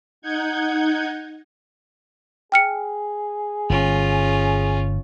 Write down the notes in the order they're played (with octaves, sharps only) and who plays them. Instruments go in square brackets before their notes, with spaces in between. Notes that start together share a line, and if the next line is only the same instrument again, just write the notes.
[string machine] D#4 F#5 G6 G#6
[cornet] G#4 [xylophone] G5 F6 C#7
[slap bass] G1 [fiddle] C#4 F4